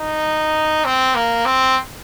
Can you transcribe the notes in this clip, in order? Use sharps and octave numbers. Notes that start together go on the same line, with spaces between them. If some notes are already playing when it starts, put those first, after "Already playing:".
Already playing: D#4
C4
A#3
C4